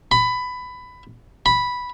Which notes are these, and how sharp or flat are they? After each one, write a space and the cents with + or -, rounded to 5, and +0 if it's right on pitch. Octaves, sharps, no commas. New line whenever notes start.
B5 +15
B5 -5